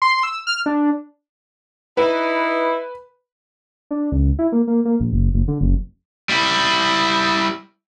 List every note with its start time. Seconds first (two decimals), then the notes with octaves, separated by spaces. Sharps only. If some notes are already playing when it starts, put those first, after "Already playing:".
0.02 C6
0.23 E6
0.47 F6
0.66 D4
1.97 D#4 E4 B4
3.91 D4
4.12 C#2
4.39 E4
4.52 A#3
4.68 A#3
4.85 A#3
5.00 A#1
5.12 F#1
5.34 F#1
5.48 D3
5.61 F#1
6.29 G3 E4